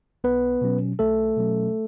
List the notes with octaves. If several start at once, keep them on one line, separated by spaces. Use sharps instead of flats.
B1 B3 B4
B2 F#3 C#4
B1 A3 A4
B2 F#3 C#4